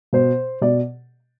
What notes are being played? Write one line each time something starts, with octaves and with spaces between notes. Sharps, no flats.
B2 C5
B2 D5